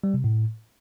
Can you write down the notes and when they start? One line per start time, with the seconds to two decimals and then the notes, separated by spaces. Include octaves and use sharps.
0.04 G3
0.14 C3
0.24 A2